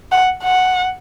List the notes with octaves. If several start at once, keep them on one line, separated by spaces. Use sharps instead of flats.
F#5
F#5